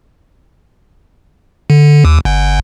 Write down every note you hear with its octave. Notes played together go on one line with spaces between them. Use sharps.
D3
D#2
G1